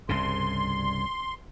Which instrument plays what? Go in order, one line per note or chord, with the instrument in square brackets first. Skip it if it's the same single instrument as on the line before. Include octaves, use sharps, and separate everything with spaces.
[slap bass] C2 G2 C#3 [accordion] C6